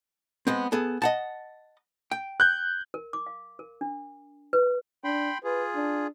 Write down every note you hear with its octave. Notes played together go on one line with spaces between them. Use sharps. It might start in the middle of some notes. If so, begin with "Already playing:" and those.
G#3 B3 C4
B3 G#4 A4
D#5 F#5 A5
G5
F#6 G6
A#4
D6
F5
A#4
D4
B4
D4 G5 B5 C6
F4 G#4 B4
D4